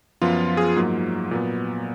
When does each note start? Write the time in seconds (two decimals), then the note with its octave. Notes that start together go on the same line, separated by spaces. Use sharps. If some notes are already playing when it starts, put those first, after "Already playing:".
0.22 F#2 F3 B3 F4
0.57 G#4
0.76 G#2 F#3 A#3
1.31 A#2 F#3 B3